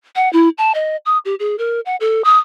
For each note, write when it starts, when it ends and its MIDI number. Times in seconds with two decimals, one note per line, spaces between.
0.16 0.31 78
0.33 0.49 64
0.58 0.72 81
0.75 0.97 75
1.06 1.18 87
1.25 1.35 67
1.40 1.56 68
1.59 1.80 70
1.86 1.96 78
2.00 2.24 69
2.24 2.38 87